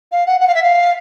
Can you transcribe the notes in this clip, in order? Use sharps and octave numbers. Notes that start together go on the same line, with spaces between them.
F5
F#5
F#5
F5
E5
F5